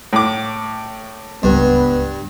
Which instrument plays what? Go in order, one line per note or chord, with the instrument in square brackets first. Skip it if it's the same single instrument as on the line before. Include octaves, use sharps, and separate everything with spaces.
[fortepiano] A2 D6
[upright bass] D1 C#2 [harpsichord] G2 [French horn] B3